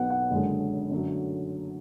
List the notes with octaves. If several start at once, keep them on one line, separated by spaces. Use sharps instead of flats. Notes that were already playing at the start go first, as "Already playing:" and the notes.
Already playing: B1 B2 F#3 B3 F#5
F#5
F#1 F#2 D3 G#3
F#2 D3 F#3 A3